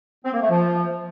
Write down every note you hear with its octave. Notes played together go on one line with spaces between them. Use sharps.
C4
A#3
A3
F3